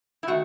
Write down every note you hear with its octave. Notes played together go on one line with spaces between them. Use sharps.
E4
D#3 A3 F#4